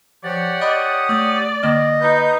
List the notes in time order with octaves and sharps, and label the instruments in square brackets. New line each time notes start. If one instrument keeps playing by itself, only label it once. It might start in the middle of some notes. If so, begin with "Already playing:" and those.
[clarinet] F3 [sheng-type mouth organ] G4 C#5 F#5 [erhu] D5 [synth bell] A6
[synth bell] D#5 B5 F#6 [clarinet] D#6
[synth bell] A3 E6 [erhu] D5
[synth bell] D3 A#3 F6 [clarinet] D#5
[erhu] D#4 [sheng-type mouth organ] B4 G6